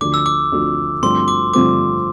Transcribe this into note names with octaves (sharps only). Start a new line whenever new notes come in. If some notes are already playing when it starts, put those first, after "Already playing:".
D2 D3 F3 D6
E6
D6
D2 D3 F3
G2 D3 F3 A3 C4 C6
D6
G2 D3 F3 A3 C4 D6